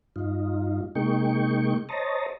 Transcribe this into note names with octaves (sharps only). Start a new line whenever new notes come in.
G2 D#4 F4
C3 G#3 A#3 D#4 G5 C#6
C5 C#5 D#5 A5 A#5